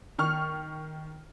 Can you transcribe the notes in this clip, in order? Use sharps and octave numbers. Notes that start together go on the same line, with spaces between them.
D#3 C#6 F6